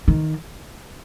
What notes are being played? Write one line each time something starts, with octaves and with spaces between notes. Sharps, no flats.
D#3